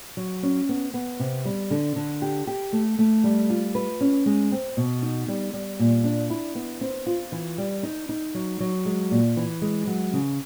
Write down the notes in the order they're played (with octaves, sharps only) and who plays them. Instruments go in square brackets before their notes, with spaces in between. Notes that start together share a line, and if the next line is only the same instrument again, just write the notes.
[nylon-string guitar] F#3
C#4
B3
B3
C3
G3
D3
D3
G4
G4
A3
A3
G3
F4
B4
C#4
G#3
C4
B2
D#4
G3
G3
A#2
D4
E4
B3
C4
F4
E3
G3
D#4
D#4
F#3
F#3
G#3
A#2
E3
G#3
F#3
C#3